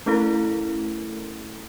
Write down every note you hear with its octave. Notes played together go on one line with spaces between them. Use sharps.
A3 C#4 E4 A4 A#4